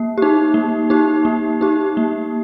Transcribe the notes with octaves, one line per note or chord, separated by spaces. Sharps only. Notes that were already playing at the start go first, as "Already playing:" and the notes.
Already playing: A#3
D#4 G4
A#3
D#4 G4
A#3
D#4 G4
A#3